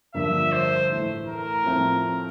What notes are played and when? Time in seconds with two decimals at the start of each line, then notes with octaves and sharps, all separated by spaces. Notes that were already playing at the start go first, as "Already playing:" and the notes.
0.14 G2 D3 F3 A#3 E5
0.52 C5
0.89 A2 E3 A3
1.27 A#4
1.64 A2 F3 A3 C4